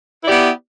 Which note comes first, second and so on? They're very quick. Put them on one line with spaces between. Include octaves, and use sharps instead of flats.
E4 D5 G4 B3